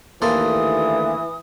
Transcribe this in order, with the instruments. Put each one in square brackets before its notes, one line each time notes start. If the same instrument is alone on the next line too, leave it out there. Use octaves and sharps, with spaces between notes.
[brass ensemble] D#2 D3 A3 [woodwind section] E3 [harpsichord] A#3 A4 C5 [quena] D#6